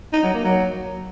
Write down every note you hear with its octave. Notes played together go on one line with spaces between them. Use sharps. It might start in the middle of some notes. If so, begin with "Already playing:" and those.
D#4
F#3
A#3
F#3